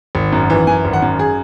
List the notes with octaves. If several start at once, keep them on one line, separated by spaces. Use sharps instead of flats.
G#1
F#2
E3
F#2 G#5
G#1
F#5
F#2
G#4